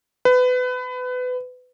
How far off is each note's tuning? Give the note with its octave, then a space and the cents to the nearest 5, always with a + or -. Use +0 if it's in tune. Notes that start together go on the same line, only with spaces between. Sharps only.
B4 +25